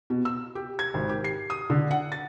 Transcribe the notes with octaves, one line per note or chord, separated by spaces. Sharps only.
B2
E6
G4
G#6
G#1
G4
C7
D#6
D3
F#5
A6